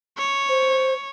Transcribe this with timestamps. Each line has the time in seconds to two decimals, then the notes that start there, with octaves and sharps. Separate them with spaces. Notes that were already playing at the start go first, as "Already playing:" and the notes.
0.18 C#5
0.49 C5